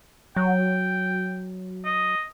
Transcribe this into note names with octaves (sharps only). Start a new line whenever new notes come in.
F#3 G5
D#5